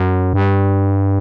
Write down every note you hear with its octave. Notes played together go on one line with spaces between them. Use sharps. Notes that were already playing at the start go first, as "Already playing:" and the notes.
Already playing: F#2
G2